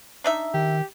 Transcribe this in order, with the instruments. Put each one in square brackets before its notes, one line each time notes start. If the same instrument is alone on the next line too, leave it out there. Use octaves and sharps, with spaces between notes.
[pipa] D4 D#4 E5
[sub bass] D#3 [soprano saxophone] G4